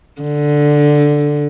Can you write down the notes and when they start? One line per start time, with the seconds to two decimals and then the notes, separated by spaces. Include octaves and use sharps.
0.21 D3